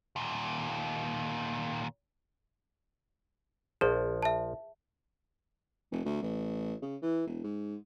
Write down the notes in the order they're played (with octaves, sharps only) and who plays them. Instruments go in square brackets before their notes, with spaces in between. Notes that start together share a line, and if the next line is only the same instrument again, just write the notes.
[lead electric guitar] D#2 A#2
[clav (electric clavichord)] A#1 F3 [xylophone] G#4 C5
[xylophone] E5 A5
[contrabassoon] F1
D2
A1
C#3
E3
E1
G#2